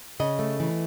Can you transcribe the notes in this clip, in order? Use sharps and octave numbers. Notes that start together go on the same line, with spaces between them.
C#3 D#5
A3
E3